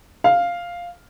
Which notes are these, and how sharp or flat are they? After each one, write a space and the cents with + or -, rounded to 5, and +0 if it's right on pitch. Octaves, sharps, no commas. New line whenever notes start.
F5 +0